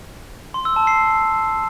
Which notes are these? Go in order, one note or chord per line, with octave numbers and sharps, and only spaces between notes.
C6
E6
A5
C7